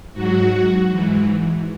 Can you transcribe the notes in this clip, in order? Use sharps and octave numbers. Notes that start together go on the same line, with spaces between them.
G#2 F#3 F#4
G#2 E3